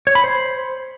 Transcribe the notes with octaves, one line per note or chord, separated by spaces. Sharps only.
C#5
B5
C5